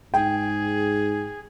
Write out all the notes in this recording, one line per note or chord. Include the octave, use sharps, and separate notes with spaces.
G#2 G#4 G5